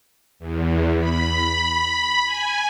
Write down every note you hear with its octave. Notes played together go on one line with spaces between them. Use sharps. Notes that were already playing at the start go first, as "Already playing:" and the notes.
E2
B5
G#5